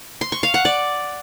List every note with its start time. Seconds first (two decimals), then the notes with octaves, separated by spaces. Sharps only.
0.21 C6
0.32 C#6
0.43 F5
0.54 F#5
0.65 D5